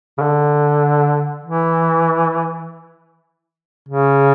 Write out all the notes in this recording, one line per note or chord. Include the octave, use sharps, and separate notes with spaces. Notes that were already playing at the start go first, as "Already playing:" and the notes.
C#3
D3
E3
C#3